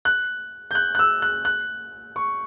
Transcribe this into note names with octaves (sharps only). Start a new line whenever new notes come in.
F#6
G6
F#6
F#6
E6
F#6
F#6
C#6